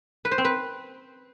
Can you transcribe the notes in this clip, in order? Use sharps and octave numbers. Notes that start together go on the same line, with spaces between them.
B4
C5
C4
B4